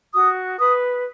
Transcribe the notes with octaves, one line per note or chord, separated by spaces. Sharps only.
F#4 D#6
B4 D#6